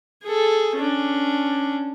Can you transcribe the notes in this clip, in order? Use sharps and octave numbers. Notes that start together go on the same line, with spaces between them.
G#4 A4
C#4 D4